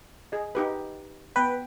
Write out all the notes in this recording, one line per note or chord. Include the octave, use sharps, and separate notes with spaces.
G#4 D#5
D#4 G4 B4
B3 B4 G5